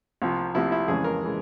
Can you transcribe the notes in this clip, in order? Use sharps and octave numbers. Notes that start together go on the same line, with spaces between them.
C2 C3 F3
C2 C3 F3 E4
E4
F2 C#3 E3 G#3 G#4
A#4
C#3 E3 G#3